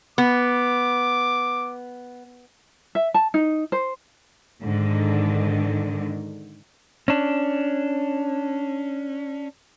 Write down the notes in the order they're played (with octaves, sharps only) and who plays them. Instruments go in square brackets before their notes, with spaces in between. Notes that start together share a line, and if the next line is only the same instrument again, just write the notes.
[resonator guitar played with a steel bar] B3 [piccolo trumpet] D6
[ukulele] E5
A5
D#4
C5
[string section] G#2 D3 D#3
[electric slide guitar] C#4 D4